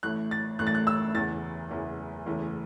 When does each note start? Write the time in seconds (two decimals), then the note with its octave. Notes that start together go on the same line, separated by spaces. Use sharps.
0.03 A1 A2 A3 F#6
0.31 A6
0.59 A1 A2 A3 F#6
0.67 A6
0.75 F#6
0.87 E6
1.14 F#1 E2 E3 A6
1.71 F#1 E2 E3
2.26 F#1 E2 E3 A3